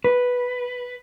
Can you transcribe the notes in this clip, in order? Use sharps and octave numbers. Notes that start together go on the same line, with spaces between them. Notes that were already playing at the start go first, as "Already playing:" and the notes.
B4